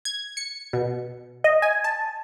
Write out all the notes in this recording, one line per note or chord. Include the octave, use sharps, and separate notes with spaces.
G#6
C#7
B2
D#5
G#5
A5